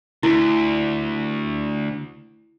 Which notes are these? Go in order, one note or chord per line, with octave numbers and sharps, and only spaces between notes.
D2 E4